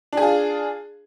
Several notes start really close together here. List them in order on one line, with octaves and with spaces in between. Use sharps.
D4 G#4 F4